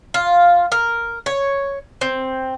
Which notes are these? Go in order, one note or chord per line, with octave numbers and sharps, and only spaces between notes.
F4
A#4
C#5
C4